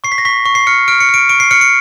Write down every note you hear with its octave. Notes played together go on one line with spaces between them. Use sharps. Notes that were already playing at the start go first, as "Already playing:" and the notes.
C#6 C7
B6
A#6
C#6 B6
C#6
C7
F6 C#7
F6 D7
C#7
F6 D7
C#6 D7
C7
F6 C#7
C#7